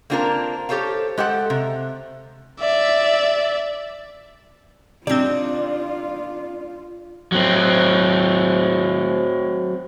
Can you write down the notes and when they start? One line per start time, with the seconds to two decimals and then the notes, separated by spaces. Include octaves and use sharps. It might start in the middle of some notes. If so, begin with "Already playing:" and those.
0.10 A#3 C4 D4 F4 F#4 A#4
0.69 G4 A4 C5 C#5 F5
1.18 G#3 G4 A4 F#5
1.50 C3
2.60 D5 E5
5.07 C3 C4 D4 D#4 F4 D5
7.32 F#3 C4